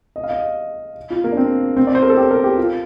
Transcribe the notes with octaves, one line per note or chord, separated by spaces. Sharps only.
D#5
F5
D#5
F4
A#3
D4
C4
C4
D5
C5
A#4
A4
G4
A#4
G4
F4